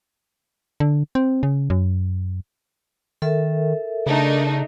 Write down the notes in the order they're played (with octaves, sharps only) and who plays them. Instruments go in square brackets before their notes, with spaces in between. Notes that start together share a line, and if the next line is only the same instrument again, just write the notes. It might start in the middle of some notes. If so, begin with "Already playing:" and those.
[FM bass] D3
C4
C#3
F#2
[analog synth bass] D#3 [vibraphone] A4 A#4 E5
[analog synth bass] C#3 [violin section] A3 D4 D#4